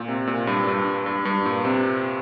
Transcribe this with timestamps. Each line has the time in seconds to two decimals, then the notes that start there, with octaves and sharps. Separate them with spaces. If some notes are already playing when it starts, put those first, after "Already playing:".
Already playing: A#2
0.08 C3
0.27 A#2
0.47 G2
0.67 G2
1.06 G2
1.25 G2
1.45 A#2
1.65 C3